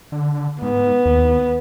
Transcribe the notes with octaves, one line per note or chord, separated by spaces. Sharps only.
D3
G#2 B3
D#2